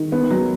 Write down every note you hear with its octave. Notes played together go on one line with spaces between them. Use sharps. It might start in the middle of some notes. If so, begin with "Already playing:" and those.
Already playing: D#3
B3
F#3